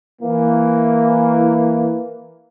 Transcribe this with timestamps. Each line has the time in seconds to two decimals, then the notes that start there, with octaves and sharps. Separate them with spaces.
0.22 E3 A#3